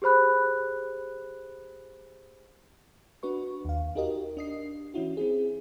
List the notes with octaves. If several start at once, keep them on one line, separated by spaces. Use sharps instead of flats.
G4 G#4 C5 B5 F#6
D4 F#4 B4 C#6
D#2 F5
D#4 F#4 G4 A#4 D#5
D4 D#5 C7
E3 C#4 E4 F#4
C4 E4 G#4